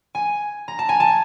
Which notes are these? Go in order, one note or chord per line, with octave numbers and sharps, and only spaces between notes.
G#5
A#5
A5
G#5
A5